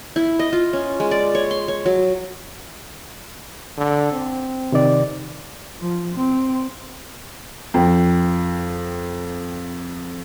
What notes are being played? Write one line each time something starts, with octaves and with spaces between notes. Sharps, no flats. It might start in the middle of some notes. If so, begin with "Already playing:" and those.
E4
D#5
F4
C#4
G#3
D5
C#5
C6
C#5
F#3
D3
C4
C3 D#3 D5
F3
C4
F2 G5